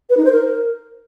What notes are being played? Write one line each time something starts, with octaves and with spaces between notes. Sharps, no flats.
B4
D#4
C5
A#4